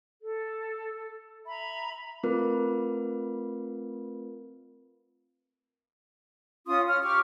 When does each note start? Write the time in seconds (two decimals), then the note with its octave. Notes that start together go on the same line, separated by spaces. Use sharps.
0.22 A4
1.47 E5 A#5 B5
2.23 A3 C4 F4 A#4 B4
6.66 C#4 F4 C6 D#6
6.87 C#5 F6
7.02 G4 C#6 D6 F6